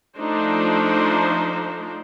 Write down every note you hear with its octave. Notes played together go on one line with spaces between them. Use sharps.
F3 A3 D4 D#4 C5